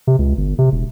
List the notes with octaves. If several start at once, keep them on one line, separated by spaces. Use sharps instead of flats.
C3
C#2
G1
C3
E1